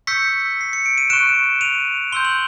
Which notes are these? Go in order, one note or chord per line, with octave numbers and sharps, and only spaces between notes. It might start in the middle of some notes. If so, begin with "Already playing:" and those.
C#6 E6 G6 B6 C#7
C7
C#7
D7
D#7
C#6 F#6 D7 E7
D#7 F7
C6 E6 G6 G7
F#7